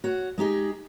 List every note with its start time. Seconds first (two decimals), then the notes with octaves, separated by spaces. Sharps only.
0.04 F#4 C#5 F#5
0.38 G#3 D#4 G4 G#4